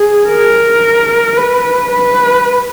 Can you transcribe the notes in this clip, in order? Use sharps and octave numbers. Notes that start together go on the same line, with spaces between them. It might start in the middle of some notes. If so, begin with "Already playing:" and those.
Already playing: G#4
A#4
B4
B4